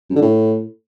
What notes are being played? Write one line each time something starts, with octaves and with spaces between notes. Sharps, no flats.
F#2
D3
A2